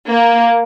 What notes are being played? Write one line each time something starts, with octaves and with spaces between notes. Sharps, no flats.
A#3